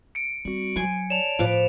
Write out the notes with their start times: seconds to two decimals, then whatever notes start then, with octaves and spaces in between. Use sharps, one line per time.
0.15 C#7 D7
0.45 G3 C4 F#4
0.76 F#3 G#5 C6
1.10 C#5 D5 A5 E7 F7
1.39 A2 F3 B4 D6